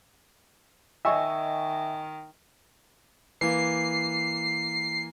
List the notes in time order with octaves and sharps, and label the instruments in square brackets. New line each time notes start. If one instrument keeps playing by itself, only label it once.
[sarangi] D#3 [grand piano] D#5 G#5 C#6 [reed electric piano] E5 E6
[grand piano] E3 A#3 [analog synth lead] C7